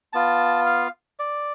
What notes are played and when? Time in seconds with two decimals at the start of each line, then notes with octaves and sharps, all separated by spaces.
0.13 B3 F4 A5
0.66 F5
1.19 D5